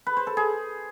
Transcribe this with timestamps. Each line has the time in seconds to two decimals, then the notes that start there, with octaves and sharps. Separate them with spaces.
0.07 B4
0.17 C5
0.27 A4
0.37 G#4